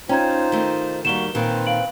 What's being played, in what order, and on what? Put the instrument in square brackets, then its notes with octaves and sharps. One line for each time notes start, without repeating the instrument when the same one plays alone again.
[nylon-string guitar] C#4 [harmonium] D#4 F4 C5 [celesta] G5 A#5 G#6
[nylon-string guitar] D#3 A3
[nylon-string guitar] D#3 G3 [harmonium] A#3 F#4 [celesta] E7 G7
[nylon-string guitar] A#2 D#3 [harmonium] C4 B4
[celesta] F5 D7 F#7